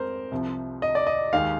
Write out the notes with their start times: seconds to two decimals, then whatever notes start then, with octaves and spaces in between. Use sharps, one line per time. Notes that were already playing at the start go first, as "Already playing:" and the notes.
Already playing: F2 G#3 A#4 C5
0.31 C2 C3 F3
0.82 D#5
0.95 D5
1.07 D#5
1.33 D#2 D#3 G#3 F5